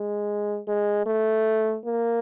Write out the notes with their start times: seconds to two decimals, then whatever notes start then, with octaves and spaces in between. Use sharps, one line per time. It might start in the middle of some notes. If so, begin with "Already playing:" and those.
Already playing: G#3
0.68 G#3
1.06 A3
1.85 A#3